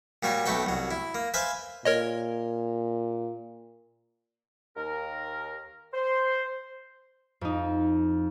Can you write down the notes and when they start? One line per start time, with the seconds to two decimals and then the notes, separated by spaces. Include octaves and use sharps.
0.23 A#2 G3 F#4 C#5
0.45 B1 A3 F#4 B4 G5
0.66 C2 F#3
0.91 E4
1.15 A#3
1.34 B4 C5 E5 F5 G#5
1.85 A#2 A#4 C#5 D#5
4.76 D#2 A#4
5.93 C5
7.41 F2 D#4